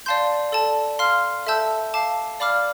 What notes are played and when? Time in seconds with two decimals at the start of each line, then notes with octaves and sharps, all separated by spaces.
0.06 D5 F5 A5 C6 G6
0.52 A4 D5 A5
0.99 F5 C6 F6
1.47 A4 E5 A5 E6 G6
1.94 F5 A5 D6
2.40 D5 F5 B5 D6 F6